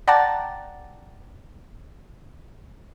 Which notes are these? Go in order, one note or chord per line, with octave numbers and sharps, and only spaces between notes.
D5 F#5 G5 A5 A#5 A6